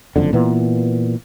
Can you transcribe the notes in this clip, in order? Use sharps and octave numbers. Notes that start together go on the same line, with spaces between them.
F#1 F2 D3
A#2 E3 B3